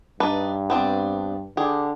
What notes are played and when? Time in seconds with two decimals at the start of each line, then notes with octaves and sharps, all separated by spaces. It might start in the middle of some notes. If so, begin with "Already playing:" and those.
0.20 G2 D4 D#4 B4
0.70 B3 C4 D4
1.57 D3 G4 G#4